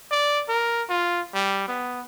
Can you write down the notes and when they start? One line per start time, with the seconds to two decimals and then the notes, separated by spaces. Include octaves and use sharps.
0.11 D5
0.49 A#4
0.89 F4
1.34 G3
1.68 B3